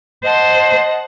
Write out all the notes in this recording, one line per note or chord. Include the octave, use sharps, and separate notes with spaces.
C5 D#5 F#5 A5